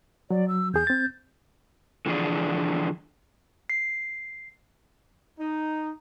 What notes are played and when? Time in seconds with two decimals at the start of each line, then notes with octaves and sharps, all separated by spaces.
0.31 F#3 D5
0.48 E6
0.74 E2 G#4 G6
0.87 C4 A6
2.06 D3 E3 F3 D4 G#4 D5
3.70 C7
5.39 D#4